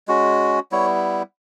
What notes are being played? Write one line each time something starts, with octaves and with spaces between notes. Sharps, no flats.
G#3 C#4 F#4
G3 B3 E4 C#5